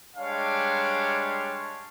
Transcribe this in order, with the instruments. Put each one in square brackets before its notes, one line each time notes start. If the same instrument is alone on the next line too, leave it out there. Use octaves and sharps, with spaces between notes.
[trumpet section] G3 G#3 D4 C#5 F5